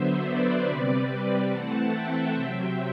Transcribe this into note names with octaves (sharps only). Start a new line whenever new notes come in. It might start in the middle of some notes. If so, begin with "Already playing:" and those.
Already playing: D3 F#3 B3 C5 E5
B4 D5
C3 G3 C4 B4 D5
B4 D5
E3 A3 C4 F#5 A5
E5 G5
C3 F#3 C4